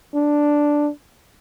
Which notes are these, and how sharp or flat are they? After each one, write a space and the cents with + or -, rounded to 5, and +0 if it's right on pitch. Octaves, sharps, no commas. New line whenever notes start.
D4 +0